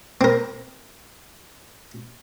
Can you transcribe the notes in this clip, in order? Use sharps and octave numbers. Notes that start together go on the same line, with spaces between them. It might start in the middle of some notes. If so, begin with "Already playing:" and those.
C4 A#4